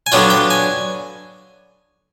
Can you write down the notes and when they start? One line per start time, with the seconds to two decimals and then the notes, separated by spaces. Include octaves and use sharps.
0.06 G#5
0.12 D3 F#3 B3 D4 F4 G5
0.30 G5
0.50 G#5